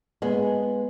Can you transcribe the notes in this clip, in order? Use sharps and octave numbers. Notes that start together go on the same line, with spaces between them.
G#3 B3